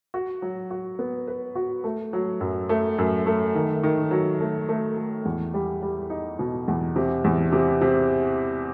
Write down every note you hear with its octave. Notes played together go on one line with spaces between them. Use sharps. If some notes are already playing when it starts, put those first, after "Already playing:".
F#4
F#3
F#4
B3
B4
F#4
A3
F#3
F#2
A3
F#2
A3
D#3
D#3
F#3
A3
A3
A3
E2
G3
G3
D#4
B2
E2
C3
E2
C3
C3